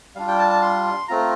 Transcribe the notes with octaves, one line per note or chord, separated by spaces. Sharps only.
G3 D4 F4 F5
G5
A5
A5
C6
A3 C4 F4 A#5